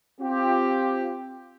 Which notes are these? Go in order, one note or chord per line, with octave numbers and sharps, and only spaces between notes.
C4 F4 G4